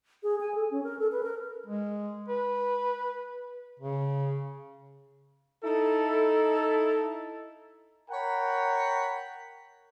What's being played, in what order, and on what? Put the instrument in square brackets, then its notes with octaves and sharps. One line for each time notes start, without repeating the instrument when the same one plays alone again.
[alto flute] G#4
G#5
A4
C#4
A#4
A4
B4
A#4
[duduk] G#3
B4
C#3
[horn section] D#4 E4 A4
A#4 C#5 F#5 G5 A#5 B5